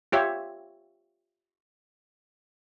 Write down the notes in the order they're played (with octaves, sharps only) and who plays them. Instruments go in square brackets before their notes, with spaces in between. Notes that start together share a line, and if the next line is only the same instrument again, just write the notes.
[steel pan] F4 G4 C#5 E5